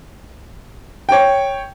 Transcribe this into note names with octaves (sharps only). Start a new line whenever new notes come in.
C#5 G5